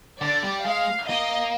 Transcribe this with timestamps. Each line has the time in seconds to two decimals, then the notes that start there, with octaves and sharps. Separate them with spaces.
0.21 D3 D5
0.43 G3
0.65 G#3 F5
1.09 A#3 D#5